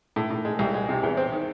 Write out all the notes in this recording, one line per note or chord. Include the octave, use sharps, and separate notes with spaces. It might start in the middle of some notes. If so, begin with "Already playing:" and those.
A2
A2
G#3
C2
G#3
C3
E2
C4
D#3